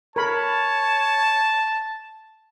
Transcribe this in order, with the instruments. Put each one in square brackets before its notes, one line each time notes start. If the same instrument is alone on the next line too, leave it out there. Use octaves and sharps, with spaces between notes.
[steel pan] A#4 B5 [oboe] C#5 [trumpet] A5